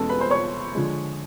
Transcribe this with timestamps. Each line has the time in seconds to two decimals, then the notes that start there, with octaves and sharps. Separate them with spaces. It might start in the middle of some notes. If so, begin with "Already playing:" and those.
Already playing: E2 B2 G#3 C#4 A4 A5
0.09 B4 B5
0.20 C5 C6
0.31 C#5 C#6
0.75 D3 F3 G#3